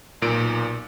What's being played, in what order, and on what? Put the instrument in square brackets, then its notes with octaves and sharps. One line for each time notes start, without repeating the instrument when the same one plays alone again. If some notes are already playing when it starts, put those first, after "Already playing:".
[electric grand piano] B1 A#2 D7